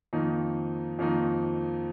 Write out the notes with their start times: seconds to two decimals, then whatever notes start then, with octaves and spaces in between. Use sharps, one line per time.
0.13 F2 D#3 A#3 D#4
0.99 F2 D#3 A#3 D#4